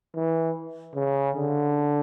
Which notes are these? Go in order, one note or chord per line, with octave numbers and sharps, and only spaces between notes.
E3
C#3
D3